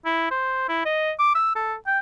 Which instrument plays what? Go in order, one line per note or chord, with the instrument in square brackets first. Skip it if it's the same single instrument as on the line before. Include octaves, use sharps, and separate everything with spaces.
[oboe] E4
C5
E4
D#5
D6
E6
A4
G5